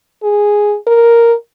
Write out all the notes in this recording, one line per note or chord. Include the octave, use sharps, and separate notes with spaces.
G#4
A#4